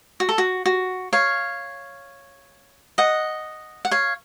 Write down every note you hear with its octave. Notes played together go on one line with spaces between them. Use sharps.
F#4
A4
F#4
F#4
C#5 F5
D#5 F#5
F#5
C#5 F5